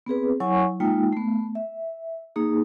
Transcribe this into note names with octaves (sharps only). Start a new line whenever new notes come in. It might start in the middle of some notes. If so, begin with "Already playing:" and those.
B3 C4 G#4 B4
F#3 E4 C#5 F#5 G#5 C#6
G#3 A#3 D#4 F4 G5
A3 B3
E5
A#3 D#4 G#4